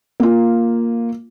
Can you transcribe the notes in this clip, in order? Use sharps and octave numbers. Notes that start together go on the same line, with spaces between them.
A#3 F4